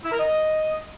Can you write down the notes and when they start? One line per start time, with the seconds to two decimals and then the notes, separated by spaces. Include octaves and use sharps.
0.04 E4
0.12 A#4
0.19 D#5